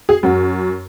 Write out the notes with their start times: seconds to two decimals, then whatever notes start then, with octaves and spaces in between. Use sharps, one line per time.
0.09 G#4
0.23 F#2 F#3 F#4